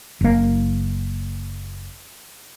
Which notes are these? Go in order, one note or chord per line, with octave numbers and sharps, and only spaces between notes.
F#1 A#3